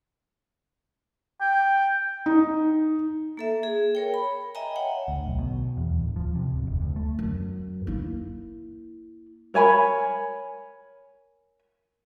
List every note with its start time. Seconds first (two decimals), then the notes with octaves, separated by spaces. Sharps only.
1.41 G5
2.26 D#4
3.37 A#3 A4 E5
3.63 G#4
3.95 A#4 C#5 G5
4.14 B5
4.55 D#5 E5 G5 G#5 A#5
4.76 C#5 F#5 G5
5.08 D2
5.26 B1
5.39 B2
5.77 E2
5.99 D1
6.16 F3
6.35 C3
6.54 D1
6.67 F1
6.81 D2
6.96 A3
7.19 F#2
7.87 A#3 E4
9.54 A#4 C#5 G#5 B5